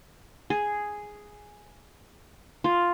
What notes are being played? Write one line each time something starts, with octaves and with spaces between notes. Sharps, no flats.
G#4
F4